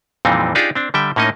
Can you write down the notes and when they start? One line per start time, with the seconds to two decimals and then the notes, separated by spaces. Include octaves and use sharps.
0.25 F2 A#2 E3 G3 C4 D#4
0.55 D4 D#4 F4 G4 G#4 D5
0.75 C4 D4
0.94 D3 G3 E5 G5
1.16 A2 A#3 C#4 D#4 D#5